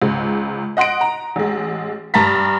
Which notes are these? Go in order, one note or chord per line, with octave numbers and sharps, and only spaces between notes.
C#2 G#2
D#5 F#5 C6 A#6 D7
A#5
A1 G#3
G2 A5 A#5 A6 B6